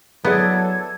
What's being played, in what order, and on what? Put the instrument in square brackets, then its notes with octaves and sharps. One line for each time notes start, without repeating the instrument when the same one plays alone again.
[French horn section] F#3 [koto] B3 [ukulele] E4 G#4 D5 [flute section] A4 G#6